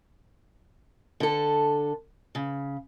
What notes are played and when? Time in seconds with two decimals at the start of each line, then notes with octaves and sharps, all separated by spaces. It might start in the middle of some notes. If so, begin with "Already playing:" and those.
1.20 D3 A4
2.35 C#3